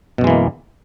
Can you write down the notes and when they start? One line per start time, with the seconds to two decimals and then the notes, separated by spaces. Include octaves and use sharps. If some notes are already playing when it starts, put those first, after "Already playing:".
0.18 B2
0.21 F#2
0.24 G#3
0.27 E3
0.30 A#3